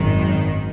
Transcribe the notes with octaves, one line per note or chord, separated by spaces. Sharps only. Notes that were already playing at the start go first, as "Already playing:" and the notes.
Already playing: G#1 F#2 D#3